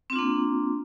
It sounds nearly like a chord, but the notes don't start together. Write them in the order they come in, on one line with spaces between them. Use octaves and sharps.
C4 F4 D4 A#3